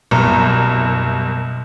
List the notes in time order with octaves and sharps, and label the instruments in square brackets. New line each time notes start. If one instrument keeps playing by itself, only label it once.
[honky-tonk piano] F#1 C2 A#5 [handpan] B2